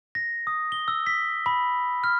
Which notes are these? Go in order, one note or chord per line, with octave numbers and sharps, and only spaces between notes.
A#6
D#6
G7
E6
B6
B5
F6